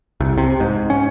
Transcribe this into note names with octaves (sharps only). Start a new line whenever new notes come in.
C2
C3
G#2
C#4